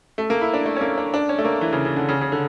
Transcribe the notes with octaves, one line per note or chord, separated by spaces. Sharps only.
A3
A#3
E4
D4
A3
C#4
A#3
D4
D4
C#4
A3
A#3
E3
C#3
C#3
D3
C#3
C#3
D3